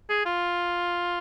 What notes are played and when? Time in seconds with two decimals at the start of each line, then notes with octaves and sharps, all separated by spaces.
0.09 G#4
0.26 F4